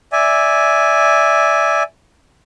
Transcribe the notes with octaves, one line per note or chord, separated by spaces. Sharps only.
D5 E5 G#5